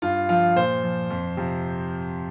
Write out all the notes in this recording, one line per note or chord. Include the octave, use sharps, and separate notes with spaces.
G2 F4
F3 F4
A#2 C5
F3
F2
C3 F3